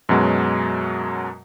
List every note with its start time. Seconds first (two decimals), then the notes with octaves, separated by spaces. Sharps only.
0.09 F#2 B2 F#3 G#3